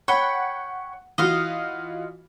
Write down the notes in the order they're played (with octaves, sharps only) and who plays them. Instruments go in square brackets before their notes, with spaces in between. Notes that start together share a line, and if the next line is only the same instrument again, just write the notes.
[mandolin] C#5 G5 B5 [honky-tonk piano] F#5
[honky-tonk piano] E3 F4 F#4 [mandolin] D#5 F5